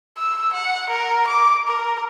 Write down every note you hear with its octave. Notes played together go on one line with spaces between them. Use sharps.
E6
F#5
A#4
D6
A#4